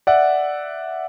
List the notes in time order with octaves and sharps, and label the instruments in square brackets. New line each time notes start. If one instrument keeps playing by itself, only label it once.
[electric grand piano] D5 E5 F#5